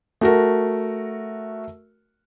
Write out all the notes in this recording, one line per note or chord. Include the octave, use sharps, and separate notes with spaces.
A3 F#4 A#4